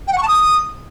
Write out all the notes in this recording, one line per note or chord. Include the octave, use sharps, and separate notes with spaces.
G5
F#5
C#6
A5
D#6